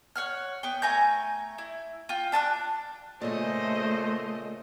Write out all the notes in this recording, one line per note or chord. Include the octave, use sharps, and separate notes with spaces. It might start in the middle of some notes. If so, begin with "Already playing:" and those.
C#5 F#5 F6
B3 G5
A3 G#5 A#5 G6
E4
F4 G5
D4 A5 B5 F#6
A#2 C#3 A3 A#3 G#4 C5 D#5